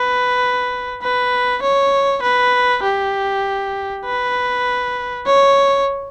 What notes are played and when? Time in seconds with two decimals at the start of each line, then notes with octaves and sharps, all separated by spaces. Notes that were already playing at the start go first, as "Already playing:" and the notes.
Already playing: B4
1.02 B4
1.62 C#5
2.23 B4
2.83 G4
4.05 B4
5.27 C#5